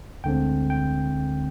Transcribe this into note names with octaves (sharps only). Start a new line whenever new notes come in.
D2 D3 G#3 C4 G5
G5